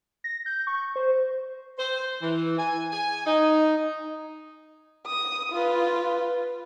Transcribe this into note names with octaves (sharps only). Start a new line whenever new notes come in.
A#6
G6
C#6
C5
C5
E3
G#5
G#5
D#4
D#6
F4 B4